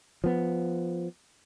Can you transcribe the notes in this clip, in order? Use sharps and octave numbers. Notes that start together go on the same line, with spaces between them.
F3 B3